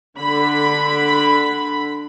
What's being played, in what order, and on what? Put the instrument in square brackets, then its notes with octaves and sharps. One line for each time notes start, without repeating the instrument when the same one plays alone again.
[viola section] D3 B5